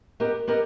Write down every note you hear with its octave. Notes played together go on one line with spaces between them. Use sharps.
B3 G4 A#4 D#5
B3 G4 A#4 D#5